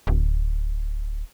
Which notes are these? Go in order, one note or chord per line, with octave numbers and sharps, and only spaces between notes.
D1